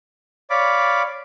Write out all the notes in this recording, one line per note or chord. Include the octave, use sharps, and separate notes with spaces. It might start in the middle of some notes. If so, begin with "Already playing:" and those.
C#5 D5 F5 B5 D6